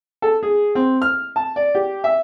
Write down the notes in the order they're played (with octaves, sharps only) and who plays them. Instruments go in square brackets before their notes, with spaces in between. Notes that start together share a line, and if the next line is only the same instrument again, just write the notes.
[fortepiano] A4
G#4
C4
F6
A5
D5
G4
E5